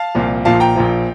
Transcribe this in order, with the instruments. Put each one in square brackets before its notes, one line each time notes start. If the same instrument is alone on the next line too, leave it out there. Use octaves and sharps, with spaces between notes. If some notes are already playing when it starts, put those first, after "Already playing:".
Already playing: [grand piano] F5 A5
C2 A#2 F3
A#1 A#2 F3 F5 A5
G5 A#5
A#1 A#2 F3